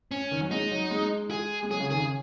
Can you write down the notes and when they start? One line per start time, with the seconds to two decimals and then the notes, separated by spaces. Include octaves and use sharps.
0.11 C#4
0.31 D#3
0.41 F#3
0.51 G#3 D#4
0.72 F#3
0.91 G#3
1.31 G#4
1.63 G#3
1.70 F#3 G#4
1.80 C#3
1.90 D#3 G#4
2.00 C#3